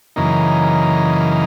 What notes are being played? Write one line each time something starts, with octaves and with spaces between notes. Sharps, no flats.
F#2 C#3 E3 A#3 D#4